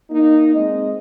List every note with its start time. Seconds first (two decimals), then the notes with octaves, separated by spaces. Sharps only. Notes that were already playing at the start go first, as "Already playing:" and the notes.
0.11 A#3 D#4
0.55 G#3 C4 D#5